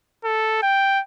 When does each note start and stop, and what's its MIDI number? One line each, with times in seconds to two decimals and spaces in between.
0.24 0.61 69
0.63 1.01 79